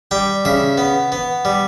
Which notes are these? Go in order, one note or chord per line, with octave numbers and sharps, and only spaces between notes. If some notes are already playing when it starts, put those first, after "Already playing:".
G3 G5
C#3 E5
B3
B3
G3